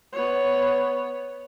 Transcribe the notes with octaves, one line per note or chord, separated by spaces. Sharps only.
B3 C#5